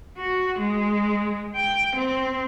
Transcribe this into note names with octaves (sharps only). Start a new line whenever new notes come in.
F#4
G#3
G5
C4